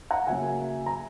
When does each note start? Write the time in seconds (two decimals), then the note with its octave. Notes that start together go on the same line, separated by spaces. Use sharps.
0.11 F#5 A#5
0.27 C#3 F#3 A#3 E5 G#5
0.86 A#5